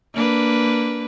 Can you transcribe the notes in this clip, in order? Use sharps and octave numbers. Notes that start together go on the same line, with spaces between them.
A#3 D4 B4